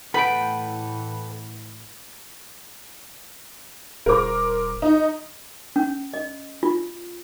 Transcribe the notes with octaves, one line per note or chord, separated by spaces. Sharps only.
A2 E3 B3 A4 B4 G5 B5 D7
D#1 A#4 C5 D6
D#4
C#4
D#5
F4